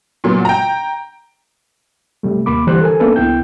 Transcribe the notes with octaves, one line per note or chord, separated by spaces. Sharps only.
A#2 F#3 B3
G5 A#5
C3 G3 A3
D#2 A#3 B5 D6
D3 E3 G3 G4 C5 F#6
A4 A#4 G#5
A#3 B3 C#4 D4 A4 B4
C2 B3 E4 G5 G6